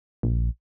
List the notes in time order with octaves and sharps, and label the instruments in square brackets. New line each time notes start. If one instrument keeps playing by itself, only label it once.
[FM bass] A#1